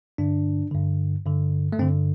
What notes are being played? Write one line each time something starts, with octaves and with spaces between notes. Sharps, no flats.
G2 D3 D4
G2 D3
G2 D3
A3
G2 D3 C4